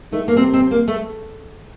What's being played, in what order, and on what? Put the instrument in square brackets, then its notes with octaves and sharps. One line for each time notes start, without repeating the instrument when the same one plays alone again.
[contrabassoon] D#3 [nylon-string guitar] A3
[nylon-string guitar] A#3
[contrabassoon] C3 [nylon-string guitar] C4
[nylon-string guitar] C4
A#3
A3